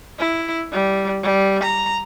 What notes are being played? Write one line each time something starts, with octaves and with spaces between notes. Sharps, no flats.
E4
G3
G3
A#5